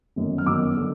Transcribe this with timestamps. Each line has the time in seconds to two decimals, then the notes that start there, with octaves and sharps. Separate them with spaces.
0.16 G1 F#2 D#3
0.38 F6
0.46 G1 F#2 D#3 D6 E6
0.77 D3